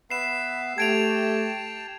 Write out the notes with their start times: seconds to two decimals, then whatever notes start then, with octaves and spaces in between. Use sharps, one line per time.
0.10 B3 B4 E5 C7 E7
0.78 A3 G4 G5 A5 G#6 D7 F7